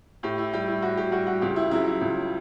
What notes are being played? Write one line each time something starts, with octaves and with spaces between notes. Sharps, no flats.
A2 G4
E4
G3 G4
E4
A2 F#4
G4
G3 F#4
F#4
C#2 G4
E4
C#3 F#3 E4
E4
C#2